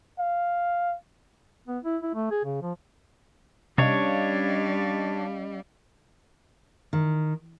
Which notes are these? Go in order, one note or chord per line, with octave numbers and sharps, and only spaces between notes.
F5
B3
E4
E4
A3
G#4
C#3
F3
C3 G3 C#4 D4 C#5 D#5 F5
D#3